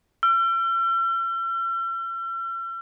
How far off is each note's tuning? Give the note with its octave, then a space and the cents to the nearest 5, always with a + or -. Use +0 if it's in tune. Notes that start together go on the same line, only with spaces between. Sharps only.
E6 +45